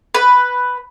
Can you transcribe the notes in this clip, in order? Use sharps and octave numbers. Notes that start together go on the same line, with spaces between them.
B4